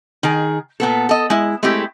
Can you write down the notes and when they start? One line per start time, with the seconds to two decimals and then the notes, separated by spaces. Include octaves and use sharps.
0.23 D#3 G#4
0.80 A#2 B3 A4
1.09 A4 D#5
1.30 G#3 E4
1.63 G#3 A3 C4 E4 G4